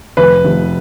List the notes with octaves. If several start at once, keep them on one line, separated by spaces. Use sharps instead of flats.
F1 B4
F1